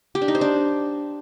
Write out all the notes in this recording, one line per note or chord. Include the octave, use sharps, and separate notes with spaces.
G4
D4
D#4
C5
D4